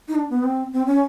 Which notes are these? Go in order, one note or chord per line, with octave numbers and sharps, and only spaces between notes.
D#4
D4
B3
C4
C4
C#4